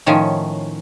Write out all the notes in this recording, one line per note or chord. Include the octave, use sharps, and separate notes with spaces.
A2 D#3 F3 C#4